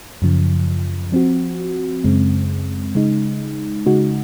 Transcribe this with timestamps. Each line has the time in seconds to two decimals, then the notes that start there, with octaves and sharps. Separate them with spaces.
0.22 F#2 C#3 F3
1.12 F3 C4 F#4
2.04 F#2 C#3 G#3 C4
2.95 C#3 G#3 D#4
3.86 C#3 G#3 D#4 F#4